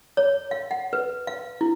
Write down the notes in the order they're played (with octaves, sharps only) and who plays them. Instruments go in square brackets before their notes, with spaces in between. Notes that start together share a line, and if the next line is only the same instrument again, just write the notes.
[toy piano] C#5
F5
F#5
B4
F5
E4